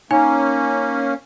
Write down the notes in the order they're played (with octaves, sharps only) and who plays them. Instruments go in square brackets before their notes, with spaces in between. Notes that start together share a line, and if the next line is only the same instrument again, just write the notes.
[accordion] A#3 C#4 [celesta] D#4 G#5